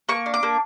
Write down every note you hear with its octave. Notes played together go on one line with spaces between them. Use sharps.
A#3 C#6
D4
D6
A#3